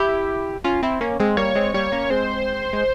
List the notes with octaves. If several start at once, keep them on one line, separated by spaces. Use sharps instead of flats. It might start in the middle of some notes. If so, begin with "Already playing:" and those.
Already playing: E4 G4
C#4 F4
C4 E4
A#3 C#4
G#3 C4
G3 A#3 C#5
G#3 C4
G3 A#3 C#5
A#3 C#4
G#3 C4 C5
G#3